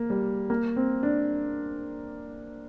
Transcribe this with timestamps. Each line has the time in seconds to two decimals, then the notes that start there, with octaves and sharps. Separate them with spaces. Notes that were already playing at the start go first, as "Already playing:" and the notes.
Already playing: A#3
0.10 G3
0.50 A#3
0.76 C4
1.03 D4